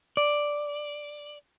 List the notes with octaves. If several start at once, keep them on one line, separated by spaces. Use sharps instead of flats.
D5